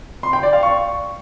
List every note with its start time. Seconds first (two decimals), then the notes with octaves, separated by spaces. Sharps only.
0.23 C6
0.33 G5
0.43 D5
0.53 F5
0.63 C#6